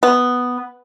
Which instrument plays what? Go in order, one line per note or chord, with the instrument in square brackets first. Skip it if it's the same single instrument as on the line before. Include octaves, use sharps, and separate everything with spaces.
[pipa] B3